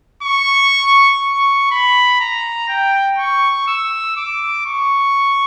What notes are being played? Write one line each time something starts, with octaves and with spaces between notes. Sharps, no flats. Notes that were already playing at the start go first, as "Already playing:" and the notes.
C#6
C#6
B5
A#5
G5
C#6
E6
D6
C#6